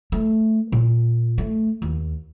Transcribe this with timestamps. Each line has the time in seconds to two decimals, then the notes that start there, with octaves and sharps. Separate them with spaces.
0.12 A3
0.72 A#2
1.38 A3
1.82 D#2